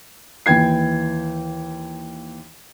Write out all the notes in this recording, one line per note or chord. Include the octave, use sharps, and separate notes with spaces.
D#2 E3 G5 G#6 C7